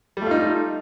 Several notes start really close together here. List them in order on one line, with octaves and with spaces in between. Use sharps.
G3 A3 F4 D#4